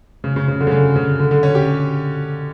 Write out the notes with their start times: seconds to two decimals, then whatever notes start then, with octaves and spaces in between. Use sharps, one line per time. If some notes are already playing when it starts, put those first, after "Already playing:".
0.24 C#3
0.36 C#3
0.48 C#3
0.60 D3
0.67 C#3
0.72 D3
0.96 C#3
1.19 D3
1.31 D3
1.43 C#4
1.55 G4